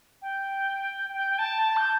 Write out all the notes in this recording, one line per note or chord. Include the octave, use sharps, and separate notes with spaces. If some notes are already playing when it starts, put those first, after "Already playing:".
G5
G5
G5
A5
A5
G6